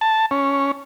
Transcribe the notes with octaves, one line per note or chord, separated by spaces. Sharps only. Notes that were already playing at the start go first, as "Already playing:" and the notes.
A5
C#4